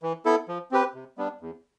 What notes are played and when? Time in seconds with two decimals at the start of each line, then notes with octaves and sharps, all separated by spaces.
0.03 E3
0.25 B3 E4 A4
0.48 F3
0.72 C4 G4 B4
0.94 C3
1.18 G3 B3 D4
1.41 E2